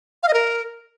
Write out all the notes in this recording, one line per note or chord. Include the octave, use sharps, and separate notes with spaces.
F5
D#5
A#4